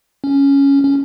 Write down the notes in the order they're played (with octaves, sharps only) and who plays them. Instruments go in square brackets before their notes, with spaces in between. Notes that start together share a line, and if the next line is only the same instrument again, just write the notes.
[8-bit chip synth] C#4
C#4